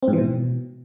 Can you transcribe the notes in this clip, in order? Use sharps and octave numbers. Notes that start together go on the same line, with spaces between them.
C4
G#2
E3
B2